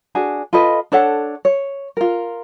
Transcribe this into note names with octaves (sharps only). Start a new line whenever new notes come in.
D4 F#4 G#4
F4 A4 B4 D#5
D4 A4 C#5 F#5
C#5
F4 A#4